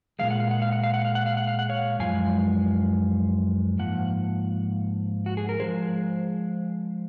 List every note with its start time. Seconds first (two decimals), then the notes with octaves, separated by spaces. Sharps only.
0.19 A#2 F3 G#3 F5
0.30 F#5
0.40 F5
0.51 F#5
0.62 F5
0.73 F#5
0.83 F5
0.94 F#5
1.05 F5
1.15 F#5
1.26 F5
1.37 F#5
1.47 F5
1.59 F#5
1.69 C#5 F5
1.99 F#2 F3 G#3 F5 G#5
3.79 G#2 F3 A#3 F#5
5.26 F#4
5.37 G#4
5.49 A#4
5.60 F3 G#3 G#4 C5